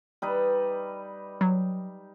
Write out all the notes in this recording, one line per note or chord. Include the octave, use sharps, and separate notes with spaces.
G3 D#4 B4
F#3